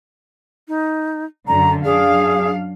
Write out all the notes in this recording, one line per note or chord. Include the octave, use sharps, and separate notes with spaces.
D#4
F#2 D3 A#5
F#2 D4 G#4 F5